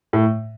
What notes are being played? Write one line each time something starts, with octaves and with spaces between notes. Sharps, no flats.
A2